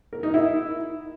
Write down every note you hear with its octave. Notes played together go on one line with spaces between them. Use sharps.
A#4
D#4
E4